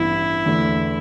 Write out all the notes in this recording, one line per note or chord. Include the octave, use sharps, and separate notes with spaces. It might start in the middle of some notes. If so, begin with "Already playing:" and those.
Already playing: A1 G2 E3 B3 E4
E2 D3 A3